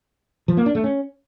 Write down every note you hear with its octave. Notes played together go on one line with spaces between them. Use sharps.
F3
A#3
D4
A3
C#4